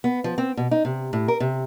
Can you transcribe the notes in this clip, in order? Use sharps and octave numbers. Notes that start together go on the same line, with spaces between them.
B3
F3
C4
B2
D#4
C3
A2
A#4
C3